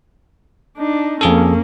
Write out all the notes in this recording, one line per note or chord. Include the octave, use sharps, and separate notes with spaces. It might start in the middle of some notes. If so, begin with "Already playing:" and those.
D4 D#4
F2 A#3 C#4 G#4 A4